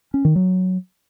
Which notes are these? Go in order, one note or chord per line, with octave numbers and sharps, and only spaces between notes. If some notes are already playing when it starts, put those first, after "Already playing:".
C#4
D#3
F#3